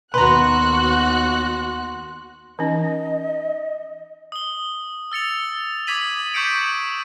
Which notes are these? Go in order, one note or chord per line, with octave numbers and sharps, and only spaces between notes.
D#2 B3 F#4 B4 A#5 C6 F#6
E3 C#4 D#4 D#5
D#6 G7
E6 A6 C#7 F7
D6 D#6 G#6 B6 D#7 F#7
C#6 D#6 G6 B6 C#7 D7